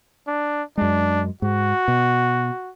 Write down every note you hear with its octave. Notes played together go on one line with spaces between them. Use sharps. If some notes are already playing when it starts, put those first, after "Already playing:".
D4
F#2 G#3 D4
G#2 F#4
B2